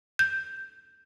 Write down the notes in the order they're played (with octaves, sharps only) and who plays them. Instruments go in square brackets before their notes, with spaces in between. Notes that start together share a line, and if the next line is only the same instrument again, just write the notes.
[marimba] G6